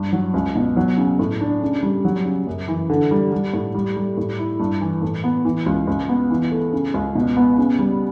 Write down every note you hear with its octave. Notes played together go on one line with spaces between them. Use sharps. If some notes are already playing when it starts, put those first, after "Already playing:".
Already playing: G2
F#3
C#2
B2
F#3
C#3
A2
D4
C#3
G3
F#3
C#3
F#2
E3
D3
G3
G3
A2
G3
G3
A2
E4
G2
E3
A2
B3
E3
C#2
C#2
B3
E3
A3
C#3
C#2
B2
B3
C#3
G3